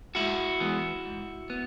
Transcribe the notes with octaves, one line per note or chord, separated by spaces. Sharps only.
G#2 E4 F#4
E3 G#3 B3
G#2
B3